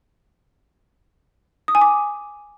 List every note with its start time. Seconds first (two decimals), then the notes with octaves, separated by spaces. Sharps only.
1.68 D#6
1.75 G#5
1.82 D6